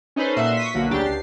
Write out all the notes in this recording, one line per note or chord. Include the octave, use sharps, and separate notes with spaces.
C#4 D#4 A4 B4 C5
A#2 F#4 E5 C6
C#6 D#6 B6
B1 D3 A#3 F#4
D2 C#3 F#3 D4 G4 A6
C#2 C7